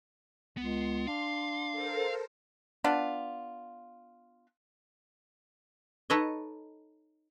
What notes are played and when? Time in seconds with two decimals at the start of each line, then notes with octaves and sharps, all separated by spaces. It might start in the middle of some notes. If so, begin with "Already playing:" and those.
0.57 C#2 B3 C6
1.07 D4 F5
1.72 A4 A#4 C5
2.84 B3 D4 F4
6.10 D#4 A4 B4 C#5 D#5